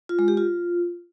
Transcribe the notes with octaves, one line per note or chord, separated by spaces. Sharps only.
F4
G#3
G4
F4